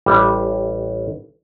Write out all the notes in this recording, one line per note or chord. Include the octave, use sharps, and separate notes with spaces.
A1 G3 E5